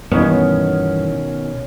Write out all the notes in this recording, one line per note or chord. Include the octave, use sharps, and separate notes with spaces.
G2 B2 D#3 E3 B3 C#4